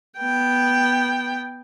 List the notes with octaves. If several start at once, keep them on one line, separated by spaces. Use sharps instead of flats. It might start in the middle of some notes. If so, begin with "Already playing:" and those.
B3 G5